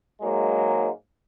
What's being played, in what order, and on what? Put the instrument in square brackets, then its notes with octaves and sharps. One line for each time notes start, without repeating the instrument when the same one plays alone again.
[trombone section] G#2 F#3 G#3 A#3